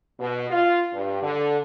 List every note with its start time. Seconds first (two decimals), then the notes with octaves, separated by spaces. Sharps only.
0.20 B2
0.50 F4
0.93 G2
1.23 D3